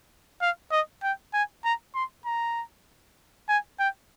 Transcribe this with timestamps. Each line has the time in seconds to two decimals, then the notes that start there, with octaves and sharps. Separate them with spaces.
0.41 F5
0.71 D#5
1.03 G5
1.34 G#5
1.64 A#5
1.94 C6
2.25 A#5
3.48 G#5
3.79 G5